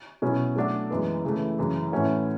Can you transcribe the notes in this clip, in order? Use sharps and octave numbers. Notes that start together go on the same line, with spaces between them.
B2 F#3 C#4 E4
F#3 A3 D4 F#4 A4
F#2 E3 G#3 B3
C#3 E3 A3
F#2 C#3 E3
A2 E3 A3 C#4 F#4